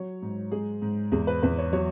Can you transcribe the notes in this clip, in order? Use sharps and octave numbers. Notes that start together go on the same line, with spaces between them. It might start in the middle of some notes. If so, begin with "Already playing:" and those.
Already playing: F#3 C#5
G#2
G#3 G#4
G#2
E2 G#4
B4
E2 B4
C#5
F#3 C#5